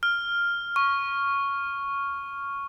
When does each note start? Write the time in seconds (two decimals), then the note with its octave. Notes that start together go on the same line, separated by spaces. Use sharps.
0.03 F6
0.76 C#6